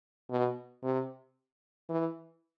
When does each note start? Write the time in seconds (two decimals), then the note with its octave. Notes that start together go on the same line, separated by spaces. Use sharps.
0.30 B2
0.83 C3
1.89 E3